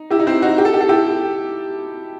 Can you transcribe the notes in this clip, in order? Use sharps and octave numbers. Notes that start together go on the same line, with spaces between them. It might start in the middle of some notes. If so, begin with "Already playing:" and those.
Already playing: D#4
E4 G4
D#4
C4 E4
D#4 F#4
G4
A4
G4
A4
E4 G4